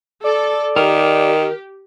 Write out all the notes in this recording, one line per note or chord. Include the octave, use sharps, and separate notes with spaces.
A4 D5
D#3 G4 A#4